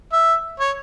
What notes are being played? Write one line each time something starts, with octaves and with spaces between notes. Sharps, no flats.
E5
C#5